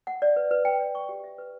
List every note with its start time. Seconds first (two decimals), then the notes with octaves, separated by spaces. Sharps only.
0.07 F#5
0.22 D5
0.36 B4
0.51 B4
0.65 G5
0.80 D5
0.95 C#6
1.09 G4
1.24 E5
1.38 B4